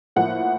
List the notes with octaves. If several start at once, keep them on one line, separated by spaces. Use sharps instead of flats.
A2 F3 A#3 F#5